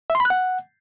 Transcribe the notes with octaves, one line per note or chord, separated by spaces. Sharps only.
E5
C6
B5
F#6
F#5